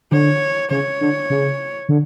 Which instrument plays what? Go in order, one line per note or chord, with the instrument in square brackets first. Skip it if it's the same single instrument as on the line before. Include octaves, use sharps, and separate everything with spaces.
[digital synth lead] D3 [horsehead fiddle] C#5
[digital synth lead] C#3 [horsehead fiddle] C#5
[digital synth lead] D3
C#3
D3